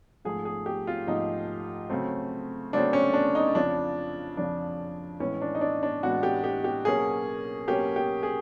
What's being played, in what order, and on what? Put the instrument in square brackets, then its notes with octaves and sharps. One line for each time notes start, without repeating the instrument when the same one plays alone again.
[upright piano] G#2 F3 A3 G#4
G#4
G4
F4
G#2 F3 A3 D#4
C#3 F#3 A3 C4
C#3 F#3 A3 C4 D4
C#4
D4
D#4
F2 C#3 F3 D4
F2 C#3 F3 D4
A2 E3 G#3 B3 C#4
D4
D#4
D4
D4
A2 E3 G#3 B3 F#4
G4
G4
G4
B2 F#3 A#3 C#4 G#4
B2 F#3 A#3 C#4 G4
G4
G#4